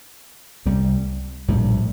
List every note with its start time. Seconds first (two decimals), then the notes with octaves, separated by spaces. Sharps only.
0.66 C2 C3 G3
1.48 A#1 A2 G3